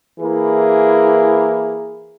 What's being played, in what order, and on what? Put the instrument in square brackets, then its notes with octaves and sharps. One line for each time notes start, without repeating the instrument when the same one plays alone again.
[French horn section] E3 A#3 E4 G#4